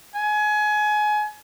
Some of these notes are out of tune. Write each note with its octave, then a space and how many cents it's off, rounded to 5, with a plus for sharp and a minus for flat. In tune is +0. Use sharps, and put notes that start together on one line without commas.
G#5 +25